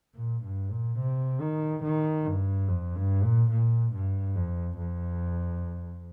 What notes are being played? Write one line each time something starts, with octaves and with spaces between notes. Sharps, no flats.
A#2
G2
A#2
C3
D#3
D#3
G2
F2
G2
A#2
A#2
G2
F2
F2